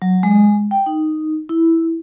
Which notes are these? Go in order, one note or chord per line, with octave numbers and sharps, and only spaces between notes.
F#3
G#3
G5
D#4
E4